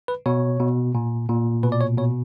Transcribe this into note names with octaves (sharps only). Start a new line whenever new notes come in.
B4
B2 C#5
B2
A#2
A#2
B2 B4
D5
C#5
B2 C#5